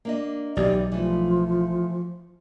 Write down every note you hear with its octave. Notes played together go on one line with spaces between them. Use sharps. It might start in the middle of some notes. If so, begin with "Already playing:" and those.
A#3 D4 D#5
B1 E3 D#4 G4 D5
E3 F3 A3